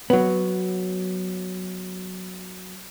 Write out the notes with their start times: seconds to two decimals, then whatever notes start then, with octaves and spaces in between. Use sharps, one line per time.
0.10 F#3 B3